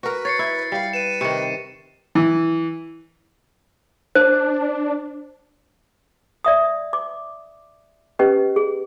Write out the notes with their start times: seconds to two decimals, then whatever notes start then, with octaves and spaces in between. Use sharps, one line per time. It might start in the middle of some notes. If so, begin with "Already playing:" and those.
0.03 F#4 A#4 B4
0.25 C#5 A6 C7 C#7
0.39 E4
0.72 G3 F5
0.93 B4 D#7 E7
1.21 C3 D#3 C#6 C#7
2.15 E3
4.15 D4 C5
6.45 D5 E5 D#6
6.93 D6
8.19 C#4 G4 B4 D#5
8.56 G#4